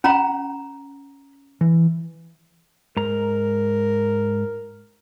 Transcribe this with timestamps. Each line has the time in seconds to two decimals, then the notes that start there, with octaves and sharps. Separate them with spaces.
0.04 C#4 F#5 A#5 B5
1.61 E3
2.97 G#2 A#4 A#5